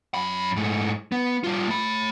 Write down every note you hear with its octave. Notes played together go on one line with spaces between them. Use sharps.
F#2 B5
G#2 A3
B3
G3 F4
A3 B5